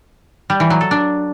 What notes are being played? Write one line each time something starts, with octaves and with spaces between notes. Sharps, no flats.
G3
E3
F#3
A4
D4